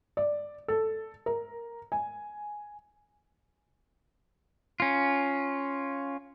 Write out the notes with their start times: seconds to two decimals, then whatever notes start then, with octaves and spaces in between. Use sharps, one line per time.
0.17 D5
0.68 A4
1.26 A#4
1.92 G#5
4.80 C#4 F4